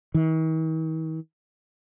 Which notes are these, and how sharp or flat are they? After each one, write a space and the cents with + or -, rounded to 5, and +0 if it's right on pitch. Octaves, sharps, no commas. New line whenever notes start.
D#3 +45